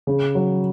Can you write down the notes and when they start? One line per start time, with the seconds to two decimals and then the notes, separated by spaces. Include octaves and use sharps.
0.07 C#3
0.35 F#3